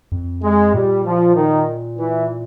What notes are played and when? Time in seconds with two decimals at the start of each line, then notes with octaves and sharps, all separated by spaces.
0.12 F2
0.43 G#3
0.74 A#2 G3
1.06 F3
1.36 D#3
1.98 E3